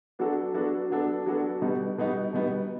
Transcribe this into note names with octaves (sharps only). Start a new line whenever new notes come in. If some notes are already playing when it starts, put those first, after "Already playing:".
F#3 B3 D4 F#4 A4
F#3 B3 D4 F#4 A4
F#3 B3 D4 F#4 A4
F#3 B3 D4 F#4 A4
B2 G3 B3 D#4
B2 G3 B3 D#4
B2 G3 B3 D#4